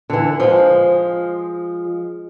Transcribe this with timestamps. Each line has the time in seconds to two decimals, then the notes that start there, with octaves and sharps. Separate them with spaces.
0.10 D3 E3
0.40 F3 G#3